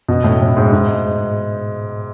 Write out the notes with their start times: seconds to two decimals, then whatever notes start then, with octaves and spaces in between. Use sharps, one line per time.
0.09 B2
0.24 A2
0.41 A2
0.57 G#2
0.72 G#2